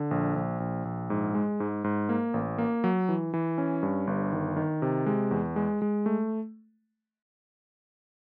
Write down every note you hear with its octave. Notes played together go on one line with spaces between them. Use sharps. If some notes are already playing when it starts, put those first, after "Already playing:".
Already playing: D3
A#1
A#1
A#1
A#1
G#2
G#3
G#2
G#2
A#3
A1
A#3
F#3
E3
E3
C#4
G2
G1
D#3
D#3
C3
G#3
E2
G#3
G#3
A3